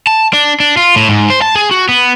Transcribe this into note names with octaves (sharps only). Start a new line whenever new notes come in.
A5
D4
D4
F4
A2
G#2
C5
A5
G#4
F#4
B3